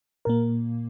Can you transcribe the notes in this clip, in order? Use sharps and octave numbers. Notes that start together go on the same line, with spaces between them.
A#2 A#3 A#4